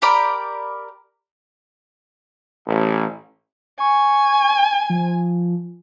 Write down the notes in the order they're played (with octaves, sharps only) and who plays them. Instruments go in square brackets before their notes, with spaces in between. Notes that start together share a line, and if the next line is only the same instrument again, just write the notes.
[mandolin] G4 A#4 D5 B5
[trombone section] A1
[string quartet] G#5 [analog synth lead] C#6
[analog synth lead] F3